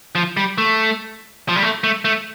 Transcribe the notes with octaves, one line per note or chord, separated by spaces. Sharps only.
F3
G3
A3
F3
G3
A3
A3
A3